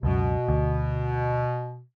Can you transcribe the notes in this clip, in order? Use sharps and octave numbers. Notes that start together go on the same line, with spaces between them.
C#2 F#2 B2
D2